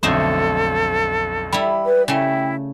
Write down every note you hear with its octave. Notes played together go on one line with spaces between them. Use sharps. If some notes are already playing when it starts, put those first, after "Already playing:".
B1 F2 D3 A3 D#4 A4 C5
G3 E4 B5
B4
C#3 A3 E4 G5